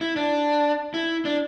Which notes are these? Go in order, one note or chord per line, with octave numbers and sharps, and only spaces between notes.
E4
D4
E4
D4